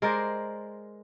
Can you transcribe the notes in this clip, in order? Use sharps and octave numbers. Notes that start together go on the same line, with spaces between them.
G#3 A#4 C5 D5